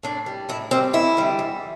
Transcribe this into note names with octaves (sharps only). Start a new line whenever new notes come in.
A2 D4
G3
A2 E4
G3 C4
E2 E4
D3 G3
E2